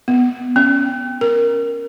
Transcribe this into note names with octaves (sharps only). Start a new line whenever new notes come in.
B3
C#4
A#4